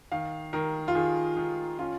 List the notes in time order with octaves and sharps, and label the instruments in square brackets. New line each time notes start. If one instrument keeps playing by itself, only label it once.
[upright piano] D#3 F5
D#3 A#4
F4
D#3 G#4
D#3
C#4 F4